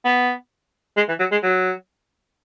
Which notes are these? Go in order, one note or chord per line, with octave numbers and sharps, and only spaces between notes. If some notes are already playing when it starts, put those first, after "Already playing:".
B3
G#3
E3
F#3
G#3
F#3